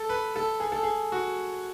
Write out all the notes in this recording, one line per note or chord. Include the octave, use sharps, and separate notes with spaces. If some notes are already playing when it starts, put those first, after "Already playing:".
Already playing: A4
B4
A4
G#4
A4
G#4
F#4